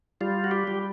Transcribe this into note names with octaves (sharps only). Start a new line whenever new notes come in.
G3 F4
F#4
G4
G3